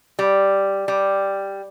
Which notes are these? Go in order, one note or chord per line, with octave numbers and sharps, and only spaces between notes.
G3
G3